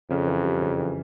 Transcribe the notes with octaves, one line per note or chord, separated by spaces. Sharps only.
F2 C#3
E3
G3
C#3
E3